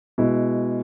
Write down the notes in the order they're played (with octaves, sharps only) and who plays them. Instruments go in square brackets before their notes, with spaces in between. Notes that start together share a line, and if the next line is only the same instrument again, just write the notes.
[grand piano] B2 G#3 E4